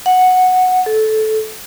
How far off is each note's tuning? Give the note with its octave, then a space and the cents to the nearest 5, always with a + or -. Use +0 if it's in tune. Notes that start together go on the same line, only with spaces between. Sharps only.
F#5 -5
A4 -15